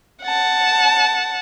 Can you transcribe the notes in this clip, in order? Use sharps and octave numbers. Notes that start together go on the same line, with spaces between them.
F#5 A5